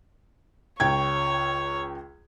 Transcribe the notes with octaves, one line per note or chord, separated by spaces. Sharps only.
C#2 C#5 G5 G#6